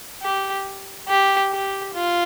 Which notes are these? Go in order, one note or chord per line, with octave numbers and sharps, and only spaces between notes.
G4
G4
G4
F4